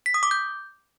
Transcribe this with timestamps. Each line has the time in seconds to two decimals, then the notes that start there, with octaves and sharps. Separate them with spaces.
0.06 B6
0.14 D#6
0.23 D6
0.31 G6